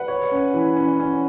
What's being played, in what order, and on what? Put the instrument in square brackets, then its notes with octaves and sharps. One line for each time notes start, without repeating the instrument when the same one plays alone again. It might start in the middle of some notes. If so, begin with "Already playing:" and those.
Already playing: [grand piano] B4 [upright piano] F#5 B5
[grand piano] C#5
C#4
E3
C#4
C#4